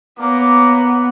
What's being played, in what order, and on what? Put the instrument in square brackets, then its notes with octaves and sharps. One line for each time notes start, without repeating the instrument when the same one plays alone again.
[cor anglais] A#3 [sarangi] B3 [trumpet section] C#5 A#5 D6